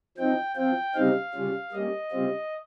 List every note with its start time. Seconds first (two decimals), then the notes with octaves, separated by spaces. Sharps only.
0.17 F3 C4 D#4 G5
0.56 F3 C4 F4 G5
0.94 C#3 G3 C4 D#4 F5
1.34 C#3 G3 C#4 F4
1.72 G3 A#3 C#4 D#5
2.11 C#3 G3 C4 F4